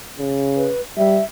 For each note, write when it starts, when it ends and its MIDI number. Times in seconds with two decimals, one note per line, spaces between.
0.19 0.71 49
0.56 0.81 71
0.97 1.20 55
0.97 1.23 76